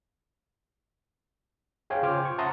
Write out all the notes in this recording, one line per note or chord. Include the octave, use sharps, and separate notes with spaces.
G#4 C5 C#5 F5 G5 G#5
C#3 F4 C5 D6 F6
C#6
E5 F#5 A5 A#5 C6 D#6